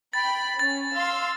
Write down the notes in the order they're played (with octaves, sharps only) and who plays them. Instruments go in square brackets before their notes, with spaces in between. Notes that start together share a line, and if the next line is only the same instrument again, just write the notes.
[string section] G5 B5 [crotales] A6
[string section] C#4 [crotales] A6
[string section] F5 C6 E6